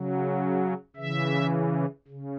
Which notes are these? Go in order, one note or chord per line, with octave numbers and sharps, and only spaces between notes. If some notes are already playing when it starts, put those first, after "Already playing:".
Already playing: C#3 F#3
C#3 E3 E5
C#3